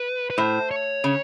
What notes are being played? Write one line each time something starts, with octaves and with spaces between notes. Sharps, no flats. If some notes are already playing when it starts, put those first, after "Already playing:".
Already playing: B4
B4
A2 C5
C#5
C#3